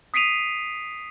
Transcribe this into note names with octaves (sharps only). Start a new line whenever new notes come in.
D#6 B6 C7 D7 D#7 F7